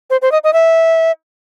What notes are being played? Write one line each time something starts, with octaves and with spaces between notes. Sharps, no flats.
C5
C5
D#5
D#5
E5